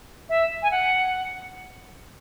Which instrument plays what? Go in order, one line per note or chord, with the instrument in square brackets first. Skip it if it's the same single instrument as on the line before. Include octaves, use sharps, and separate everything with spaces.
[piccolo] E5
G#5
F#5